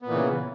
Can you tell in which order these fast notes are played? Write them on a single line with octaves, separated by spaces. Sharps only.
B3 A#2 E3 C#3